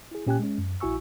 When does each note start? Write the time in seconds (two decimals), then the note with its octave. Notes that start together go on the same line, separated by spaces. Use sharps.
0.11 E4 G#4
0.26 A#2 C#4 G4 G5 G#5 F#6
0.39 G#3 C#4
0.58 F#2
0.80 A#1 E4 F#4 G#5 C#6 E6